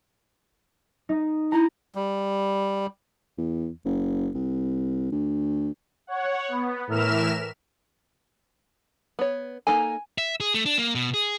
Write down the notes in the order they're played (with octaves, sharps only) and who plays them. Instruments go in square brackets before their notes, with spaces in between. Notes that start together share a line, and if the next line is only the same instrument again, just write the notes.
[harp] D#4
[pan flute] E4 [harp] A#5
[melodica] G3
[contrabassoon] E2
F#1
C2
D2
[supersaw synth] C#5 F#5
B3
A2 E3 A#4 E5 F6 E7
[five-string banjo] B3 C#5
[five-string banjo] A#3 D#4 A4 [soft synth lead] G#5
[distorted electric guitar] E5
G#4
A3
D4
A#3
B2
G#4